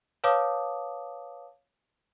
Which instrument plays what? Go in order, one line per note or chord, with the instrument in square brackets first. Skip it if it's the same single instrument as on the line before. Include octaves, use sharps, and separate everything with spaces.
[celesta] B4 C#5 F5 A5 D6 D#6